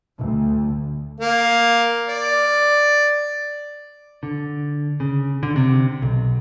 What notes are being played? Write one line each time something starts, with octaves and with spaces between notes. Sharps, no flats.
D2
A#3
D5
D3
C#3
D3
C3
B1